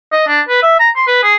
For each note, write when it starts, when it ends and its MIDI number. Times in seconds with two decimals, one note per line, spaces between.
0.13 0.25 75
0.28 0.41 62
0.49 0.62 71
0.63 0.79 76
0.80 0.90 82
0.96 1.05 84
1.07 1.19 71
1.23 1.35 68